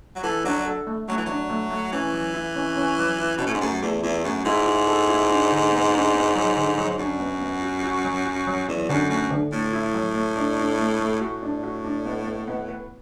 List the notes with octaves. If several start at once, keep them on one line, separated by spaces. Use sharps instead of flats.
F#3
E3 A4
F#3 D4
A4
A3
F#3 A3
E3
F#3 D4
A3
A3
E3 C#4
F#3
E4
C#4
C#4
F#3
E4
B2 C#4
A2
G#2
F#2 A3
E2 A3
E2 E4
F#2 A3
G#2 E4
E4
A4
E4
D4
D3
B3
D4
B3
F#3
D3
F#3
G#2
F#2 D4
B3
B3
F#4
F#4
F#3
F#4
F#3
E2 F#3
F#2 D3
F#2 A3
D3
A2 A3
E4
F#3
A3
D4
D4
A3
A3
A2 F#4
D4
F#4
D4
B3
B3
B3
B4